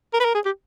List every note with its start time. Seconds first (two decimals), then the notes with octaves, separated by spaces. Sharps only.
0.13 A#4
0.20 B4
0.25 A#4
0.34 G#4
0.45 G4